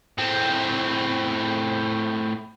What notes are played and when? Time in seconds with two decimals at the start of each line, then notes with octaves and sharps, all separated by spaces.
0.18 A2 C4